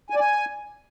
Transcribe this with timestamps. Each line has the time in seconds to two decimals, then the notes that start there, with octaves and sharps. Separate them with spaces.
0.10 G#5
0.15 D5
0.20 G#5